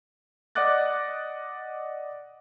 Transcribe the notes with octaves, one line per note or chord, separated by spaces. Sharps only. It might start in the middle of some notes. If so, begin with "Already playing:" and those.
D5 D#5 F#5 D6 F#6 A6